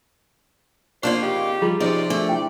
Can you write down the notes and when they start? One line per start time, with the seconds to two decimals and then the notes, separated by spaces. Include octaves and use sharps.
1.03 F2 A#3 D4 F4 C5 D5 C#6
1.23 C#3 D#4 G4
1.62 F3 G3 F4 G#4 A#5
1.80 C3 F3 C#4 D#4 G4 D5
2.10 A3 D4
2.29 E4 G5